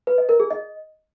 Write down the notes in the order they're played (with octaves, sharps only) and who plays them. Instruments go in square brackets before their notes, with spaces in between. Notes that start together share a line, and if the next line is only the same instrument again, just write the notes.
[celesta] B4
D#5
A#4
G#4
D#5